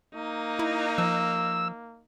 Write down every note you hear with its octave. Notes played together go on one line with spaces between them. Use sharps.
A#3 D#4
E4
F3 E6